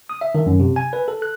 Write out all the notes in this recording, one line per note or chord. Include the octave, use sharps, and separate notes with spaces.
D#6
E5
D#3
F#2
C3
G#5
B4
A4
F#6